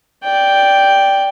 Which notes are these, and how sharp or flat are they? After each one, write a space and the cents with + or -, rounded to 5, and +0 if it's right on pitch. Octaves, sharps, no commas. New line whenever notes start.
D5 -5 G5 +0